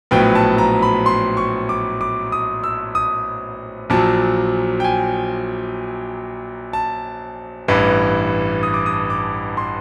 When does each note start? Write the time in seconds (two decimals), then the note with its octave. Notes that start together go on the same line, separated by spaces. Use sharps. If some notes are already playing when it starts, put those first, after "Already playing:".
0.11 A#1 A2 F#3 B3 G5
0.35 A5
0.58 A#5
0.83 B5
1.06 C6
1.37 C#6
1.69 D6
2.01 D6
2.32 D#6
2.64 E6
2.95 D#6
3.90 A#1 A#2 F#3 A5
4.80 G5
4.84 G#5
6.73 A5
7.68 A1 G2 E3
8.63 D#6
8.74 D6
8.86 D#6
9.10 D6
9.57 C6